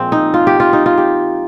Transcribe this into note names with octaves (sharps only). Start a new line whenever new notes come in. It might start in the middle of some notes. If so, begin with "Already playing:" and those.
Already playing: A#2 F3 G#3 C4
D#4
F4
G4
F4
D#4
F4
G4